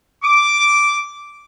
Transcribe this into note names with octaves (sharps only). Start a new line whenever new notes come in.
D6